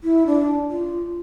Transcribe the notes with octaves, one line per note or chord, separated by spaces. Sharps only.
E4
D4
F4